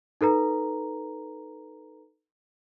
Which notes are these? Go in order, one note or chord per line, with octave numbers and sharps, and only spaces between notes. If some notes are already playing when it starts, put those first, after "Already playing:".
D#4 A4 B4 A#5